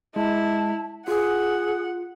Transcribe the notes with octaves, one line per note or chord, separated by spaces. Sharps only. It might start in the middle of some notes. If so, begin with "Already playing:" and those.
G#3 E4 A5
F4 G#4 F#5